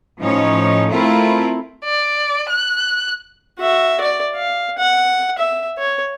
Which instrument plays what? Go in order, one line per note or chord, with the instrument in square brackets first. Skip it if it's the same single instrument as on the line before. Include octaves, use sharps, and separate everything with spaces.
[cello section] A2 F3 C#4 D#4 C#5
A3 C4 E4 F4 A#4
[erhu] D5
F#6
[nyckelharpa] F#4 E5
D5
F5
F#5
E5
C#5